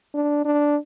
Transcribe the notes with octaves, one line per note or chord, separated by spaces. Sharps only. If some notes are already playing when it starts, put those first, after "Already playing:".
D4
D4